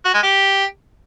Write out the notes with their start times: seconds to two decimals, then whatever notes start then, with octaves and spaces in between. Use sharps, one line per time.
0.05 F#4
0.14 G#3
0.23 G4